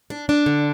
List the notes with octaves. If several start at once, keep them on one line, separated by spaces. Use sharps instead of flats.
D4
D4
D3